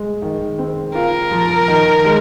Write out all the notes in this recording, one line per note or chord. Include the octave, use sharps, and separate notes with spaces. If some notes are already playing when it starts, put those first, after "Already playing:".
Already playing: G#3
D#3
C4
F4 A#4
F3
D#3
G#3